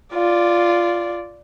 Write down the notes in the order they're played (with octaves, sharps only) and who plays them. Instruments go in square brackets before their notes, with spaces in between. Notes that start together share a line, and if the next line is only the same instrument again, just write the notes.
[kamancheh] F4 D5